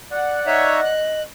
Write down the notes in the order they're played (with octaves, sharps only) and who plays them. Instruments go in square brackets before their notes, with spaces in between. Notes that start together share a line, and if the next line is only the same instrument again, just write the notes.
[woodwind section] D5 F#5
[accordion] D#4 C#5 E5 [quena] D#5
[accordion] F#6